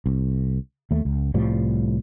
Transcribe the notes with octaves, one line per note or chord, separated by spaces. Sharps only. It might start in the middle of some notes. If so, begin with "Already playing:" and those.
C2
D#2 A3
C#2
C2 A2 F3 G3